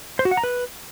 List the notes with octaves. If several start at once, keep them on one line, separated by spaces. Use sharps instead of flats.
C5
F#4
F#5
A#5
B4